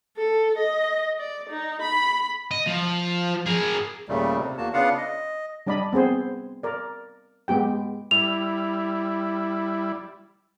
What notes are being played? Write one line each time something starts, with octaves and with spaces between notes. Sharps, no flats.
A4
D#5
D5
D#4
B5
D#5
F3
G#4 A#4
D#2 A#2 C#3 G3 A3
C3
E2 A#3 F#4 A5
C#3 B3 D4 F4 F5 F#5
D#5
G3 D4 D5 D#5 B5
B3 C4 G#4 C5
A#4 D5
G#3 B3 G4 G5
G3 E4 F7